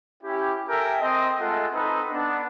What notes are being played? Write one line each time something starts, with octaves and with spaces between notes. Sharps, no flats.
C#4 E4 G4
A4 A#4 E5 G5 G#5
C4 D#5
G#3 A3 F4 A4 F#5
C4 D#4 A4 B4
B3 D4